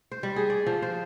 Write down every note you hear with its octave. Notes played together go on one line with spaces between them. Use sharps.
C5
G3
G#4
D5
F3
C5